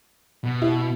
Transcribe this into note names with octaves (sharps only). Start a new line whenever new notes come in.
B2
E4